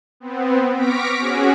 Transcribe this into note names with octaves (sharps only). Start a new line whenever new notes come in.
B3 C4
C#6 D6 F6 A#6 B6 D7
C#4 F#4 G#4